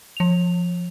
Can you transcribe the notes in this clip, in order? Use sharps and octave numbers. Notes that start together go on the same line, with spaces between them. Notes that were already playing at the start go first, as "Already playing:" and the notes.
F3 F7